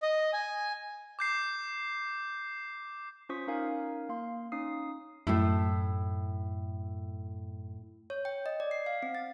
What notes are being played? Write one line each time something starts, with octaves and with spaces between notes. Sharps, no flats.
D#5
G#5
D6 G6 C7
C#4 F4 C5 C#6 D#6 B6
C#4 D#4 A#4 F5 G#5
A#3 F5 C6
C#4 D#4 F5 D#6 C7
F#2 A2 A3 E4
C#5
G5
D#5
D5
C7
F5
C4
A6